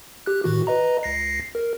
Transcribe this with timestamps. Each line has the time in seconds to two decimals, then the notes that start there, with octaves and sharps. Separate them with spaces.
0.26 G4 F#6
0.44 A2 D#3 F#4
0.67 B4 D#5 A#5
1.03 C#2 A#6 C7
1.55 A#4